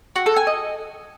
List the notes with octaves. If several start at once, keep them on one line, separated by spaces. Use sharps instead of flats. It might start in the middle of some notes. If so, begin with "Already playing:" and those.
F#4
A4
G#5
D#5